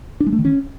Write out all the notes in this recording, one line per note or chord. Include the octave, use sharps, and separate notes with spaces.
D4
G#3
A3
D#3
C#4